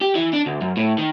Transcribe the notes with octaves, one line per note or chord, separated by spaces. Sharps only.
G4
E3
D4
D2
F#2
A2
D#3